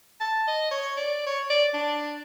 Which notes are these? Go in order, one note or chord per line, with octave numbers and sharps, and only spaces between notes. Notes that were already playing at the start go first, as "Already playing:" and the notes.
A5
D#5
C#5
D5
C#5
D5
D4